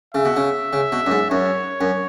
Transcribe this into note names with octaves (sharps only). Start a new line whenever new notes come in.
C#3 E5
B2
C#3
C#3
B2
F#2
G#2
F#2 C#5
F#2